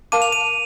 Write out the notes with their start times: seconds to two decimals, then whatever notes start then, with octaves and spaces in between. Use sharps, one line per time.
0.12 A#4 F5 A5 D6 D#7
0.22 F7
0.32 D#7